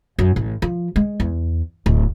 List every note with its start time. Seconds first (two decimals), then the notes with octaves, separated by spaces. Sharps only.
0.19 F#2
0.36 A1
0.62 F3
0.96 G#3
1.20 E2
1.86 D1